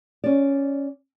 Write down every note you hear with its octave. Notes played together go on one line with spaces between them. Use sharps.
C#4 D5